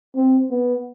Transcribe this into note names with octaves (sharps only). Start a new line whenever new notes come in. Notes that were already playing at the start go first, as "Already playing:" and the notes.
C4
B3